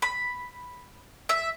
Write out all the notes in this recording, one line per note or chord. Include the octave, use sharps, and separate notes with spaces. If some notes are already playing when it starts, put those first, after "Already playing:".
B5
E5